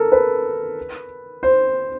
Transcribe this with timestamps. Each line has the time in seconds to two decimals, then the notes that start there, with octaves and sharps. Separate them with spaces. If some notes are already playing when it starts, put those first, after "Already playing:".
Already playing: A4 A#4
0.12 B4
1.43 C5